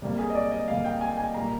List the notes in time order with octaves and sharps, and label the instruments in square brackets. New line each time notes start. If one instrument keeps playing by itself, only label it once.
[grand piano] C3 G3 A#3
G#4
D#5
D5
D#5
C3 G3 A#3 F5
G5
G#5
G#5
A#2 G3 A#3 A#5